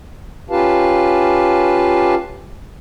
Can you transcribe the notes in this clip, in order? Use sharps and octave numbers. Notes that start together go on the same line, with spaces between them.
C#4 F4 G4 B4 F5 A5